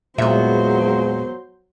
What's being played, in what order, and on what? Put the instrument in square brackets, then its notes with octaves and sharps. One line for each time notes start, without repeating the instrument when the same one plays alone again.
[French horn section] E2 G#3 F4 [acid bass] A#2 [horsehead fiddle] F#3 C5 [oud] B3 E5